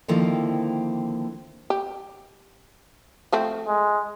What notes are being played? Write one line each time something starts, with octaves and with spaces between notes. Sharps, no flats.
D3 D#3 F3 A#3 C4 E4
G4
F3 A3 C4
G#3